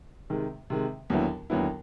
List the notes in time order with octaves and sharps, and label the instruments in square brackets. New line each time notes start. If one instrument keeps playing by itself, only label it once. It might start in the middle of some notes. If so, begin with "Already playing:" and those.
[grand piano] C3 D#3 G#3
C3 D#3 G#3
D#2 D3 F#3 B3 E4
D#2 D3 F#3 B3 E4